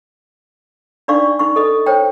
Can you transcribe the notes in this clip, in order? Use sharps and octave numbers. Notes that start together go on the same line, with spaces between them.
D4 D#4 D5 F5 C#6
D#4 C#6
A4 D#5
C5 C#5 G5